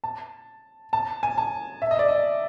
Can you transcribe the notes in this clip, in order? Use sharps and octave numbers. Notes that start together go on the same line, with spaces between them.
A5
A5
G#5
A5
E5
D#5
D5
D#5